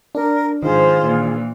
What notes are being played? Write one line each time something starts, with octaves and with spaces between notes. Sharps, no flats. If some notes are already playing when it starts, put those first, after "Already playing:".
D4 A#4
G#2 D#3 F3 F4 G#4 C5
A#2 E3